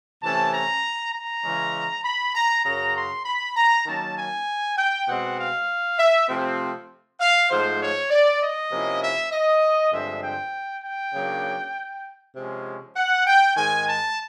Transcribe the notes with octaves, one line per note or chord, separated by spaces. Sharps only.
C3 E3 A3 C#4 A5
A#5
A#5
C#3 E3 G#3 C#4
B5
A#5
F#2 C#3 F#3 A#5
C6
B5
A#5
D#3 F#3 A#3 C#4 A5
G#5
G5
B2 G#3 C4 F#5
F5
E5
C3 F3 A3 C4
F5
G#2 F3 A3 C5
C#5
D5
D#5
C3 F3 A#3 C#4 E4
E5
D#5
G2 D3 F3 G#3 C4 E5
G5
G5
C#3 F#3 A#3 D4
C3 F3 G#3 C#4
F#5
G5
G#2 D#3 G#3 G#5
A5